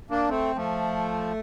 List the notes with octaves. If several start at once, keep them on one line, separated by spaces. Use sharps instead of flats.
A#3 D4
A3 C4
F3 A3